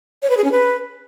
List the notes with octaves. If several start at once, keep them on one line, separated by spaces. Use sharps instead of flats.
C#5
B4
G#4
C#4
B4